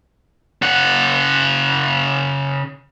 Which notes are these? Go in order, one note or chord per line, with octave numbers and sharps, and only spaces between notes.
C#3 F#5